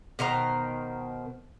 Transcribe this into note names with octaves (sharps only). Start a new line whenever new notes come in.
B2 D#3 C5 A#5